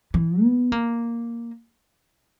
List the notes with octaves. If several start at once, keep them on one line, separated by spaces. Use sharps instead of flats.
E3
B3
A#3